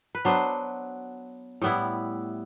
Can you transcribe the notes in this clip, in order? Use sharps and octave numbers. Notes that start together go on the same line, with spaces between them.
B4
F#3 B3 D4 C5
A2 G3 B3 E4